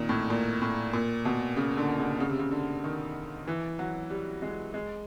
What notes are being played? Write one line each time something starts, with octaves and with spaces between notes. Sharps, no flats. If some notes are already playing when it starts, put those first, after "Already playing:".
Already playing: A#2 D#3
A2
A#2
A2
A#2
B2
C#3
D3
C#3
C#3
C3
C#3
D3
D#3
E3
F#3
G3
G#3
G#3